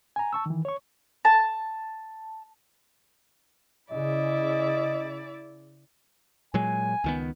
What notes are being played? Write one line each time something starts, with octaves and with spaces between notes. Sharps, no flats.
G#5 A#5
A5 C#6 E6
D#3 E3
C#5 C#6
A5
C#3 E4 D5 D#5
A#2 F#3 G#3 G#5
C#2 D#3 B3